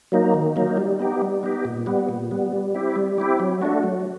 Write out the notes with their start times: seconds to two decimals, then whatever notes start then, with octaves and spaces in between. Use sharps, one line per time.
0.12 F#3 A#3 D#4
0.34 D#3
0.56 F#3 A#3 D#4
0.77 G3
0.99 B3 D#4 G4
1.21 G3
1.43 B3 D#4 G4
1.65 A#2
1.86 G3 B3
2.09 A#2
2.31 G3 B3
2.52 G3
2.74 C4 E4 G4
2.96 G3
3.18 C4 E4 G4
3.40 F#3
3.62 A3 D4 F#4
3.83 F#3